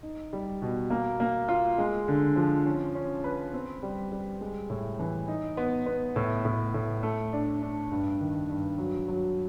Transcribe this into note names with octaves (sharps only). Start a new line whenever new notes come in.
D#4
G3
B2
A#3
A#3
F4
G#3
D3
F3
C#4
C#4
B4
C4
G3
G3
G#3
A2
E3
D#4
B3
B3
A2
A2
A2
A3
D4
D4
G2
D#3
G2
F#3
F#3